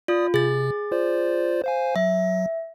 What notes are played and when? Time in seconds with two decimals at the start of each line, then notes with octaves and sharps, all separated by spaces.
0.08 F4 D5 D#6
0.34 C3 G#4 A6
0.92 F4 C5 D5
1.64 C5 F5 G#5
1.96 F#3 E5